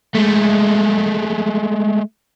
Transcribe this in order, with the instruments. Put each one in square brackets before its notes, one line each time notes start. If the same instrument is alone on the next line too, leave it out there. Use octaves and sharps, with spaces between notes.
[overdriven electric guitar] G#3 A3